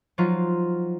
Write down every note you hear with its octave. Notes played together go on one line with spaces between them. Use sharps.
F3 F#3 D#4 F4